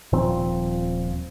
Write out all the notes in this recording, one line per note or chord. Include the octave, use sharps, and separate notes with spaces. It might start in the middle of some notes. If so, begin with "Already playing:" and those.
D#1 A#2 F3 C4